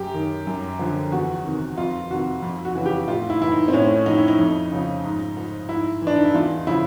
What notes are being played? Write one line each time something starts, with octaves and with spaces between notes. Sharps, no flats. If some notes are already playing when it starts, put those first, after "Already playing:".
Already playing: F#2 G4
D#3
F#2
D3 F3
E2 F#4
C3 D#3
F2 F4
C3 D#3 F#4
F2
F#4
C#3 E3
G4
A2 F4
E4
E3 E4
D#4
C4
A2 C#4
F3 D#4
E4
D#4
F2
C#3 F3
G#2
F3
G#2 E4
E3 D4
D#4
E4
E2 F4
C#3 F3 E4